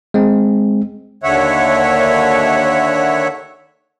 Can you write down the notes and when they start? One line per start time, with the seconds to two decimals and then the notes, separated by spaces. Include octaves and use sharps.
0.14 G#3 C4
1.23 D#2 D3 C#5 E5 F#5